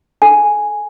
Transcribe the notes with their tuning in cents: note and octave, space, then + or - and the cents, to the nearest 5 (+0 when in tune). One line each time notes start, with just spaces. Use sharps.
A4 -15 G#5 +0